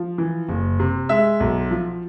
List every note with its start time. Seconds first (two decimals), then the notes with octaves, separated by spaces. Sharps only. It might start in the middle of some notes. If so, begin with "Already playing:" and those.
Already playing: F3
0.18 E3
0.49 F#1
0.79 C3
1.09 G#3 E5
1.40 B1
1.71 F3